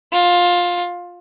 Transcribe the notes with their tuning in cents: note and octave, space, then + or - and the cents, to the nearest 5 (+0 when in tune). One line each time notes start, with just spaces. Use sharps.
F4 +15